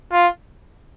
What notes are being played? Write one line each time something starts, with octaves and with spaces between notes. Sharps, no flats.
F4